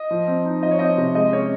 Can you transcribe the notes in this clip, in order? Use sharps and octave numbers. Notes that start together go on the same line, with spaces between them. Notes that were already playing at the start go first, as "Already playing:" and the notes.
Already playing: D#5
F3
C4
D#4
F3 D#5
C#5
C4 D#5
C3
G#3 D#5
C#4 C#5